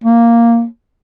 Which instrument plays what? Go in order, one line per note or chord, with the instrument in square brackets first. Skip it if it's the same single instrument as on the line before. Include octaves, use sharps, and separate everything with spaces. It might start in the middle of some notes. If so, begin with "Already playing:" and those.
[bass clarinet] A#3